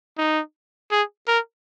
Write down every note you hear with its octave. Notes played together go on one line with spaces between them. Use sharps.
D#4
G#4
A#4